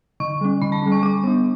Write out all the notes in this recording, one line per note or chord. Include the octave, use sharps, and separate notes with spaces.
D3 C#6
G3 C#4
D3 B5
A5
G3 C#4
C#6
G3 D6
B3 D4